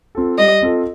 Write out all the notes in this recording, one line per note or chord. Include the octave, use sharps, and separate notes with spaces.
C4 F4 A4
G3 D#5
C4 F4 A4